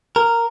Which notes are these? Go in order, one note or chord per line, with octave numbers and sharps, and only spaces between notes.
A#4